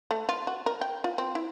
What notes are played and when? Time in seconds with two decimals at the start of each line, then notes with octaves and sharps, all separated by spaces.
0.11 A3
0.29 F4
0.47 F#4
0.66 A#4
0.81 G5
1.04 F4
1.18 C4
1.35 E4